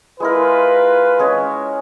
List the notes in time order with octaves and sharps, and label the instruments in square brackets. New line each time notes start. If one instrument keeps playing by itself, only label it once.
[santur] G#3 E4 A#4 [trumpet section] F4 B4
[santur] G#3 C#4 C#5